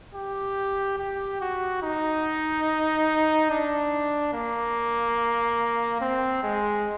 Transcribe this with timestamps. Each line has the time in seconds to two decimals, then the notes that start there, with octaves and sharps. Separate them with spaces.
0.15 G4
0.99 G4
1.41 F#4
1.83 D#4
3.50 D4
4.33 A#3
6.01 C4
6.43 G#3